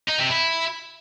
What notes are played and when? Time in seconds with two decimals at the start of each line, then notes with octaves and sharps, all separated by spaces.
0.08 D#4
0.19 C3
0.29 E4